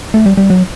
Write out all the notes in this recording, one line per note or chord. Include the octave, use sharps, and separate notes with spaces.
A3
G3
G3
F#3